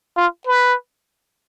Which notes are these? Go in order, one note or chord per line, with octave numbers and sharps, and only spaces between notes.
F4
B4